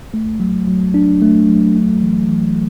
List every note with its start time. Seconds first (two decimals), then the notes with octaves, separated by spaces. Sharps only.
0.14 A3
0.40 F#3
0.67 F#3
0.94 D4
1.22 A3
1.49 F#3
1.76 A3
2.02 E3
2.29 E3